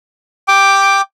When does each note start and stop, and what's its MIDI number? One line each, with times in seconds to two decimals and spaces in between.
0.48 1.01 79
0.48 1.01 86